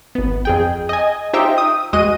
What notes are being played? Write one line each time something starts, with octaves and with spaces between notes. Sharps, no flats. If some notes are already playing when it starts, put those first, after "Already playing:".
G#1 B3
F2 G#4 G5
D#5 G#5
D#4 F4 G4 C5 E5 G5
D#6
E2 G#3 F#4 D#5 D#7